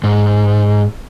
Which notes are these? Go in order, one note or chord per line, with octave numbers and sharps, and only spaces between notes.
G#2